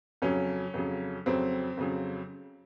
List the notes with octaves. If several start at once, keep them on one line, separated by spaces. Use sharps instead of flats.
F2 C#3 F#3 C#4
F2 C#3 F#3
F2 C#3 F#3 C4
F2 C#3 F#3